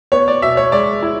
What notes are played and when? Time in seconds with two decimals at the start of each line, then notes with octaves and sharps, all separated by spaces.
0.12 B3 C#5
0.28 D5
0.42 B2 E5
0.57 C#5
0.72 G#3 D5
1.03 E4